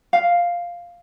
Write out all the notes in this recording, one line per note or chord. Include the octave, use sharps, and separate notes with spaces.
F5